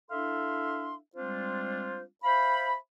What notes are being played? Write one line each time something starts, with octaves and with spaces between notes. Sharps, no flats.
D4 E4 A4 E5 F5 C6
G3 G#3 C4 D4 F4 C5
C5 E5 F5 B5